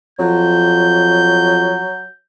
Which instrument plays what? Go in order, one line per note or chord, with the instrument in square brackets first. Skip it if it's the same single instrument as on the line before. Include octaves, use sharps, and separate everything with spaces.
[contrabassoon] F2 [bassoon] F#3 [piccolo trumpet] G6